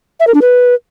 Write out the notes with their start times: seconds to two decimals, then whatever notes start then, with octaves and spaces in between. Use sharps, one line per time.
0.20 E5
0.27 A#4
0.34 D4
0.42 B4